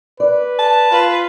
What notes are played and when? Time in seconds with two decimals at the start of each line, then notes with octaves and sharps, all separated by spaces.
0.20 B4 D5
0.59 A5
0.91 F4 B4